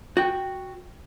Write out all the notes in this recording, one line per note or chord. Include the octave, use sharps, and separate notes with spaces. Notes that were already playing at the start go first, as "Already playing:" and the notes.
F#4 G5